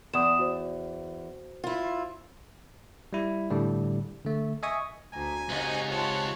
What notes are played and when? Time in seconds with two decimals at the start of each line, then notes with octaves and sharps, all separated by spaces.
0.14 E2 D#6 E7
0.39 F#4 C5
1.64 E4 F4
3.13 G3 E4
3.50 A2 D3 G3
4.25 D3 A3
4.63 D#5 E5 G#5 C#6 D#6
5.13 D2 G#5 A#5
5.50 C#2 G#2 C3 D#4 F#4
5.90 F4 C#5 F#5 A5